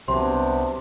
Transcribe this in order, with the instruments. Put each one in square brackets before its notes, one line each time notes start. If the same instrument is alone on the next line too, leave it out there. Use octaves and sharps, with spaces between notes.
[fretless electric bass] C2 F#3 [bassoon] C3 [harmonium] B3 D4 G4 [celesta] C6